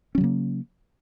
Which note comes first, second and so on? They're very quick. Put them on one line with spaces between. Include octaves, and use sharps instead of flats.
C#4 F#3 C#3 A#3